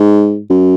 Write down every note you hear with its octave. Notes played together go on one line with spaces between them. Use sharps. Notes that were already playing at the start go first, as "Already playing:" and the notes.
Already playing: G#2
F#2